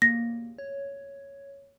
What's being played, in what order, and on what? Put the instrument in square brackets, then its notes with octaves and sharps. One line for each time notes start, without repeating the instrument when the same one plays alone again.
[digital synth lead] A#3 [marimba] A#6
[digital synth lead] C#5